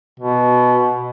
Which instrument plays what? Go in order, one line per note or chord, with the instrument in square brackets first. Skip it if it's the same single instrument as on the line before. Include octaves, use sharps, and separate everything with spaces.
[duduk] B2